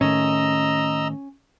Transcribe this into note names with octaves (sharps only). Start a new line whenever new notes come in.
A2 D#3 A3 C#4 D#5 A#5 E6